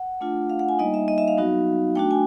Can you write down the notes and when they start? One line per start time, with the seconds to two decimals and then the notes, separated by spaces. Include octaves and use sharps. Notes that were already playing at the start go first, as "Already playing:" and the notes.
Already playing: F#5
0.21 A3 D4 F4
0.50 F5
0.59 F#5
0.69 G#5
0.79 G3 A#3 D#4 D#5
0.94 E5
1.08 D#5
1.18 E5
1.28 F5
1.37 F#3 B3 D#4 F#4
1.96 A3 D4 F#4 G5
2.11 G#5